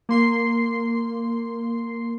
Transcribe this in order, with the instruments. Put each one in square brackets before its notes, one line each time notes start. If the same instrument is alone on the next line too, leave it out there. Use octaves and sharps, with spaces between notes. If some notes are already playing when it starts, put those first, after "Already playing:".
[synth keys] A#3 C6 C7